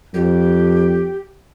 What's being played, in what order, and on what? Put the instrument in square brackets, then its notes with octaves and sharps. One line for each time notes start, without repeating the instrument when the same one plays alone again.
[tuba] F2 [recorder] G4